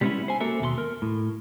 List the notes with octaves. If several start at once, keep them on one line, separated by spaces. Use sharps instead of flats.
G3 G#3 A#3 B3 C#4 E4
C5 G#5
A#3 F#4 A4 A#4 E5
D#2 B2 A4 C6
A#4
A2